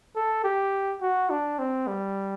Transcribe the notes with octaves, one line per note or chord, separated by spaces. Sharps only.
A4
G4
F#4
D4
C4
G3